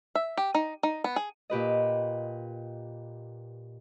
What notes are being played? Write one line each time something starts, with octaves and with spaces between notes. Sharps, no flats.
E5
G4
D#4
D#4
B3
G#4
A#2 G4 B4 D#5